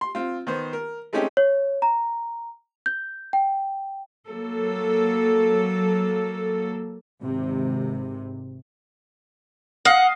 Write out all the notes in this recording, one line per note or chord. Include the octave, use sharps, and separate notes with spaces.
C6
C4 F4
D#3 B3 C5
A#4
G#3 A3 C4 C#4 D#4 G4
C#5
A#5
G6
G5
F#3 A#3 A4
G#1 C3
D#5 F5 F#5